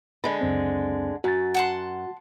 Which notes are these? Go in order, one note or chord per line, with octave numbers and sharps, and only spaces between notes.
D3 G#3 B5
C#2 F#2 C4
F#2 F#4 A6
F#5 A5 C6